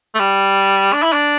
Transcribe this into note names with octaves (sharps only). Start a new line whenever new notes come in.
A3
G3
D4
E4
D4